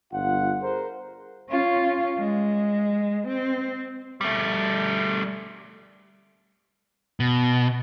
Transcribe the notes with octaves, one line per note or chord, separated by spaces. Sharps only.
G1 F4 F#5
G#4 A#4 C5
C#4 F4
G#3
C4
G3 A3
B2